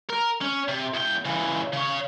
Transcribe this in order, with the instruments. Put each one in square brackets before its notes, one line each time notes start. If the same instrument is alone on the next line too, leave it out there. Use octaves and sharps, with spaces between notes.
[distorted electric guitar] A#4
C#4
C3
E2 G5
C#3 E3
C#3 C#5